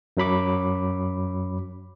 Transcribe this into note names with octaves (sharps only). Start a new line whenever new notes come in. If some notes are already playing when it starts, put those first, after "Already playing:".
F#2 F#3 B5 D6